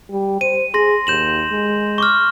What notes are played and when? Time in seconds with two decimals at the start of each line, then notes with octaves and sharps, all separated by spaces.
0.10 G3
0.41 C5 D#7
0.74 G#4 C6 A#6
1.07 D#2 G6 E7 F#7
1.51 G#3
1.98 C#6 D6 F6